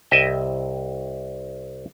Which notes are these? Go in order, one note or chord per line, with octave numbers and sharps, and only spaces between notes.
C2 D#5 E5 G5